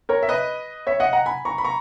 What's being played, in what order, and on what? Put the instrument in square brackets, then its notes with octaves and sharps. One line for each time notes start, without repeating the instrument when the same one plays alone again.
[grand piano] A#4 C#5
E5
B4 D#5
C#5 E5
D#5 F#5
F#5 A#5
G#5 B5
A#5 C#6
B5
A#5 C#6